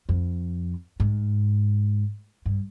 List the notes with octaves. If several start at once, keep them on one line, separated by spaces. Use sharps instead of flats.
F2
G#2
G2